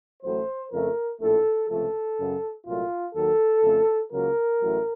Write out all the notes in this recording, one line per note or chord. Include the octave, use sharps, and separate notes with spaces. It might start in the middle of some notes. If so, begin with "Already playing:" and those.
A1 A2 F#3 A3 C5
F2 C#3 F3 A3 A#4
A#1 A2 A3 A4
C#2 C3 F3 A3 A4
F#2 C#3 F#3
C2 A#2 F#3 A3 F4
D#2 D#3 F#3 A4
F2 C#3 A3
C#2 C#3 F#3 A#3 A#4
A1 A2 F#3 A3